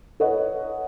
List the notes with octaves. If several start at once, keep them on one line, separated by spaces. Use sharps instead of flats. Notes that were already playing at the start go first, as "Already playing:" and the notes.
A4 B4 C#5 D#5 F#5